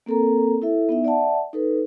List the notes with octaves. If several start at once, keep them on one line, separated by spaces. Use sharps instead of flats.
A#3 C4 A4 A#4 A#5
E4 A4 E5
B3 D#4 E5
D5 E5 F#5 A5
D#4 A4 B4